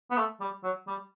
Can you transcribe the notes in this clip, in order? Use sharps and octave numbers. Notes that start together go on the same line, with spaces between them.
B3
A3
G3
F#3
G3